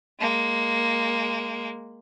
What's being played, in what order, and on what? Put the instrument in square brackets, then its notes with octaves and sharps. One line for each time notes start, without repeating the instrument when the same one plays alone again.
[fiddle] G#3 A#3